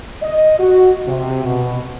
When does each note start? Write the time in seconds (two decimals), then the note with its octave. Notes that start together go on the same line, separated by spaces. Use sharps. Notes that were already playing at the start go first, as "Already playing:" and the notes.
0.22 D#5
0.59 F#4
1.08 C3
1.45 B2